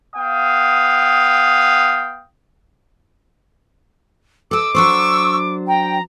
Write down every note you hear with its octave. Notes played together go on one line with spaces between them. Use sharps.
B3 F5 G5 D#6
A4 D#5 D6 E6
F#3 D4 C5 C#6 E6
G5 A#5